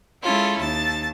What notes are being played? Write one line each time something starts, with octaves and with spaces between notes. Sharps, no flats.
G#3 C#4 E4 F4 A4
D#2 A5 A6